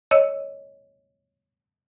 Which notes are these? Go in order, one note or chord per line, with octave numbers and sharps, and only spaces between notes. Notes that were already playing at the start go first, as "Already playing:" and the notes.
C#5 D#5 E6